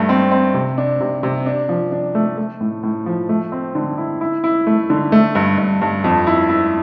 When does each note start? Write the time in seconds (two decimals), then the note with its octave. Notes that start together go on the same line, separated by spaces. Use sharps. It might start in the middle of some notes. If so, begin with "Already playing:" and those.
Already playing: G2 A3
0.09 C4
0.32 C4
0.54 C3
0.78 D4
1.01 C3
1.23 C3
1.46 D4
1.69 F3
1.92 D4
2.15 A3
2.38 A3
2.61 A2
2.83 A2
3.06 F3
3.29 A3
3.52 C4
3.75 D3
3.98 E4
4.21 E4
4.44 E4
4.67 A3
4.90 D3
5.12 A3
5.35 G2
5.58 G2
5.82 G2
6.04 F2
6.27 E4
6.49 E4